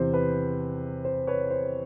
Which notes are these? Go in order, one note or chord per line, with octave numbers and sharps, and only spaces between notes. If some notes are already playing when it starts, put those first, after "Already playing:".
Already playing: E2 C3 E3 C5
B4
C5
B4 C#5
C5